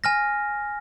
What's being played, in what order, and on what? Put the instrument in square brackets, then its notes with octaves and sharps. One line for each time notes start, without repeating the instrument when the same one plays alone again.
[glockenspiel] G#5 F6 A#6